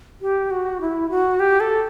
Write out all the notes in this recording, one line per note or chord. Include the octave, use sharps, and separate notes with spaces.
G4
F#4
E4
F#4
G4
A4